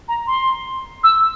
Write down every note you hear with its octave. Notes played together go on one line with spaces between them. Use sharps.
A#5
C6
E6